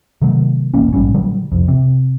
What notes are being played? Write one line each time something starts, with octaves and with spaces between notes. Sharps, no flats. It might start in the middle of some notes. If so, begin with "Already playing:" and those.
C3 D#3 F#3 A3
E1 A1 A#3 C#4
A#1 G#2 G3 C#4
A#2 D3 F#3 G3
C2 F2
C3